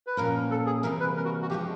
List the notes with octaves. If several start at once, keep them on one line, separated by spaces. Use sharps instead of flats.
B4
A#2 F3 A#3 C#4 A#4
A4
G#4
C3 E3 G3 A#3 A#4
B4
A#4
F#4
F#4
F3 G#3 B3 D4 F4 G4